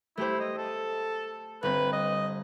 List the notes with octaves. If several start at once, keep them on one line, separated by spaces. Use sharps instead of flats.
A3 E4 G4 C5
D#5
A4
G1 C4 B4
D#5